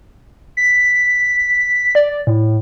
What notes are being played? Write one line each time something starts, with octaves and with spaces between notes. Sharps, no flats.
B6
D5
A2